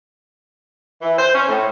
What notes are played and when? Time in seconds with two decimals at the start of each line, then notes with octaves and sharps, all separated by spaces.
1.02 E3
1.19 C5
1.35 C#4
1.49 A2